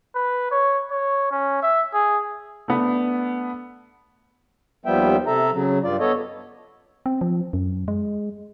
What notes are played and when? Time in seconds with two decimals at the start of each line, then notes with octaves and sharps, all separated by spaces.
0.15 B4
0.51 C#5
0.91 C#5
1.31 C#4
1.63 E5
1.94 G#4
2.68 A3 B3 D4
4.85 D#2 F3 G3 B3 E5 G5
5.27 C3 A4 E5 A#5
5.52 C#3 F#3
5.84 G2 F4 D5
6.00 B3 A4 C#5 D#5
7.06 C4
7.21 F3
7.53 F#2
7.88 G#3